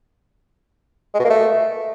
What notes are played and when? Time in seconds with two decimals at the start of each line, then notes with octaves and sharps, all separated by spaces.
1.14 G#3
1.20 B2
1.25 A#3
1.30 A3